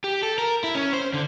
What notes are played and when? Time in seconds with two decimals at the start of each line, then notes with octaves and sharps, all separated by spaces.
0.04 G4
0.23 A4
0.38 A#4
0.64 E4
0.75 C#4
0.93 C5
1.14 D3